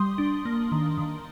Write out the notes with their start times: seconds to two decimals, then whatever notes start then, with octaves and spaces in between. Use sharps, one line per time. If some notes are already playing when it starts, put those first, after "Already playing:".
Already playing: G3 C6 D#6
0.18 D4
0.45 A#3
0.72 D#3
0.98 D#3